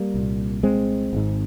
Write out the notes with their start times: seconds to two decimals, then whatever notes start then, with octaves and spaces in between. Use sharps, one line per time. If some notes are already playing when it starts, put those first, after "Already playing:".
Already playing: G3 A#3
0.14 C2 A#2
0.63 G#3 C4
1.13 G#1 G#2